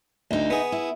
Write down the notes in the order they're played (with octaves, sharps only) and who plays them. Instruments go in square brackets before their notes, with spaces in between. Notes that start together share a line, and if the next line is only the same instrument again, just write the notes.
[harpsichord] D2 [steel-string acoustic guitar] D#4 E4
[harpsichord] B3 G#4
[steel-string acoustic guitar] E4